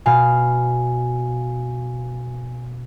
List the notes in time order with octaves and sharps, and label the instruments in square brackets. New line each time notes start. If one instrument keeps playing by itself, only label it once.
[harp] B2 F5 [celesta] G#5